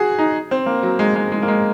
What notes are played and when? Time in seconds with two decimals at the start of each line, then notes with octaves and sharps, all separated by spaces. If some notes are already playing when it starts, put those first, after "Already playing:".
Already playing: F#4 G#4
0.19 D#4
0.51 C4
0.66 A#3
0.83 F#3
0.99 G#3
1.16 G#3
1.32 G#3
1.42 A#3
1.48 G#3